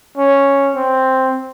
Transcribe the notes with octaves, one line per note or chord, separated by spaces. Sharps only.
C#4
C4